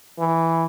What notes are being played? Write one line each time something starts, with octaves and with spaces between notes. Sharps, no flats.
E3